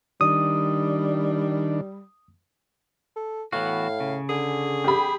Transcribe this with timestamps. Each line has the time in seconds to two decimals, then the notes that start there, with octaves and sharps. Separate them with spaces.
0.21 D#3 G3 D4 D#6
3.16 A4
3.53 A2 E3 B3 F#4 F5
4.00 C#3
4.29 D3 G#4
4.84 G4 B5